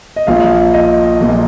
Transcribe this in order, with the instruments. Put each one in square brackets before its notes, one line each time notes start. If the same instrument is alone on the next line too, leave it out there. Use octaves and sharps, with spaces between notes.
[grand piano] D#5
A#1 A#2 F3 F5
D#5
A#1 A#2 F3